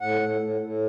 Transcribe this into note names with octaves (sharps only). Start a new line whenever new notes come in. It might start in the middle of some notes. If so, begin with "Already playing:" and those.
A2 F#5
A2
A2
A2